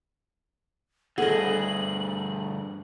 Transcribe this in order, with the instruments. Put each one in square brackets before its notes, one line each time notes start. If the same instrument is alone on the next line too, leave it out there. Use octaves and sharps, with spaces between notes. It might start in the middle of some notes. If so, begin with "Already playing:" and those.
[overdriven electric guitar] D2 G2 [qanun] G#4 D#5 [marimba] A4 F#5 [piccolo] F#7